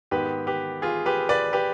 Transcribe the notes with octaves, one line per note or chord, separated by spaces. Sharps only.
G#2 D#3 B3 G4 B4
G4 B4
F4 G#4
G4 B4
B4 D5
G4 B4